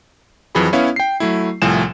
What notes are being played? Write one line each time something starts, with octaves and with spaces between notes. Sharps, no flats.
F2 E3 F#3 G#4 B5
B3 C#4 E4 C#5 F5
G5 C7
F#3 A3 E4
C2 A2 F3 G#5 E7